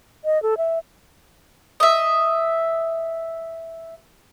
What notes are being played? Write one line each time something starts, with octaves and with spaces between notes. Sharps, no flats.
D#5
A4
E5
D#5 E5